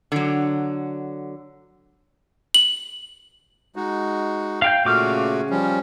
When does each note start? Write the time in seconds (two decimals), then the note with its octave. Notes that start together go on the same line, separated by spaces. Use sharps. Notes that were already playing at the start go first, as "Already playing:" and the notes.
0.12 D3 F#3
2.54 F#7
3.76 G#3 D#4 F#4
4.62 F5 G5 G6
4.85 A#2 C#3 A3 F#4 D6 F6
5.50 F3 G3 C#4